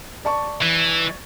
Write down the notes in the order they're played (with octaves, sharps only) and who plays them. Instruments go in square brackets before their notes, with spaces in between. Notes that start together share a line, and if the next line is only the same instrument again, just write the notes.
[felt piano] D5 A5 C#6
[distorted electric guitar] E3